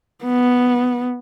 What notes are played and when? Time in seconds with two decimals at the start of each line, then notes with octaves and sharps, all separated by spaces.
0.25 B3